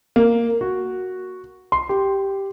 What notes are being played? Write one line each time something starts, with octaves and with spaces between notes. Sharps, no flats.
A#3
F#4
C6
G4